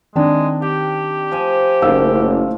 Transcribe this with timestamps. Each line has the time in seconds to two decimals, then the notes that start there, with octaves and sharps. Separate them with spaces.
0.15 D#3 G#3 C4 D4
0.62 G4 G5
1.31 F3 G#5
1.82 F#1 A2 D#4 F5 E6